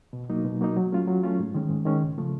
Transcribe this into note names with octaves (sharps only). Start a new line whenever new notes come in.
B2
F#3 A#3 D#4
B2
F#3 A#3 D#4
F#3
A3 C#4 F4
F#3
A3 C#4 F4
G#2
D#3 G#3 C#4
G#2
D#3 G#3 C#4
C#2
C#3 F3 A3